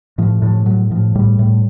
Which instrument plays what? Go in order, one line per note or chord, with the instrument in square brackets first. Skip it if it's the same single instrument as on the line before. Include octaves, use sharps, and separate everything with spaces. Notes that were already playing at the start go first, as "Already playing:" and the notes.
[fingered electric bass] A2 F3
A2 F3
A2 F#3
A2 F3
A2 G3
A2